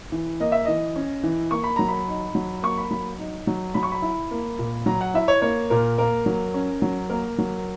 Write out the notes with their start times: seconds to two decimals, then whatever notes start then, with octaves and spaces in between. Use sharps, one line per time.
0.12 E3
0.40 A#3 D#5
0.52 E5
0.65 E3 D#5
0.96 C#4
1.23 E3
1.51 A#3 C#6
1.64 B5
1.76 F#3 A#5
1.88 B5
2.08 D#4
2.35 F#3
2.63 A#3 C#6
2.78 B5
2.91 F#3 B5
3.18 D#4
3.47 F#3
3.74 F#3 B5
3.83 C#6
3.92 B5
4.02 E4
4.31 A#3
4.59 A#2
4.86 F#3 A#5
5.01 F#5
5.14 E4 E5
5.28 C#5
5.42 A#3 C#5
5.70 A#2 A#4
5.98 A#3 A#4
6.26 F#3
6.54 C#4
6.82 F#3
7.10 A#3 A#4
7.38 F#3